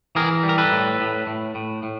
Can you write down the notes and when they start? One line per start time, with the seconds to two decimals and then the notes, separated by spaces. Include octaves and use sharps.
0.15 E3 G#4 A#4
0.43 G3
0.49 A#4
0.58 A4 B4
0.72 A2
1.00 A2
1.27 A2
1.55 A2
1.83 A2